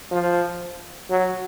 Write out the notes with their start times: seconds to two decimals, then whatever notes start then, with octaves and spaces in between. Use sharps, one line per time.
0.11 F3
1.10 F#3